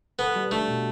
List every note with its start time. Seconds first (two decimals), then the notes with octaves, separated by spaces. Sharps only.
0.19 B3 A4
0.35 G3
0.51 A3 D4
0.68 B2